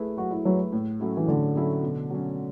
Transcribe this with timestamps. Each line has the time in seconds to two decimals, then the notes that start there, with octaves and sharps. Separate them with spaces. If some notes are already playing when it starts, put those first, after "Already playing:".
Already playing: A3 E4 G#4 B4
0.17 F#3 F#4
0.31 E4
0.45 F#3 A3 E4 G#4 B4
0.72 A2
1.00 F#3 C#4 E4 A4
1.17 E3
1.28 A2 D3
1.55 F#3 C#4 E4 A4
1.83 B2
2.10 F#3 C#4